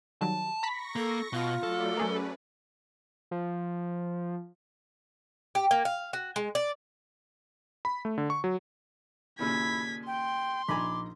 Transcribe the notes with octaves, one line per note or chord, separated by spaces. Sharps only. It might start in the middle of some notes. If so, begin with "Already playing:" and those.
D#3 F#3 G3 A5
A#5 B5 C#6 A#6 B6
A#3 A4
B2 F4
F#3 A3 A4 D5
A3 C#4 G#4 A#4 B4
F3
G4
A#3
F5
F#4
G#3
D5
B5
A3
D3
C#6
F#3
D#2 A#2 C#3 E4 G#6 B6
G5 C6
A#1 D#4 G#5 A#5 B5 D6